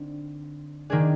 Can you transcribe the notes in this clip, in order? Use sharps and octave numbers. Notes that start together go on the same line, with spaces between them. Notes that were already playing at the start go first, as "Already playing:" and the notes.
Already playing: D3 C4 D#4
D#3 A#3 D4 G#4